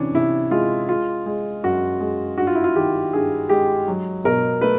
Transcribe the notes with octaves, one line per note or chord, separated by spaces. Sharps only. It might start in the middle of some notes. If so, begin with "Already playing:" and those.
Already playing: C3 E3 C#4 D4
C3 E4
G#3 F4
G#3 F4
G#3
F#2 F#4
G#3
G2 F#4
F4
E4
F4
D#3 G4
G2 G#4
G#3 G4
F#3
B2 A#4
A3 B4